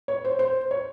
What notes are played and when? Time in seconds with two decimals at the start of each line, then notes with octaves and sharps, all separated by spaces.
0.08 C#5
0.25 C5
0.39 C5
0.71 C#5